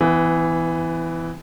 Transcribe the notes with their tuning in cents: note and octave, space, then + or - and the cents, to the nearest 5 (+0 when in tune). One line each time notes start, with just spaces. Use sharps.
E3 +0 B3 +30